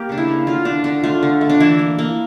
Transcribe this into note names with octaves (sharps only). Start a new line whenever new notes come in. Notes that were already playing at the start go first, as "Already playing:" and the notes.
Already playing: A#3 G4
C#3 D4
E4
A#3
D3 F4
A3 D4
D3 D4
A3 F4
D3
A3
D4
E3 E4
A#3
A#3